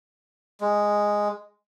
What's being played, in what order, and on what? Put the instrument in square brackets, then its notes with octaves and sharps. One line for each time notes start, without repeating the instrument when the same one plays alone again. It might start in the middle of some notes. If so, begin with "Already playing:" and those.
[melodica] G#3